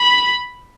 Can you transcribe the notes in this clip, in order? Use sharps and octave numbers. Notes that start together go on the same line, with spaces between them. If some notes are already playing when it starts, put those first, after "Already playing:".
Already playing: B5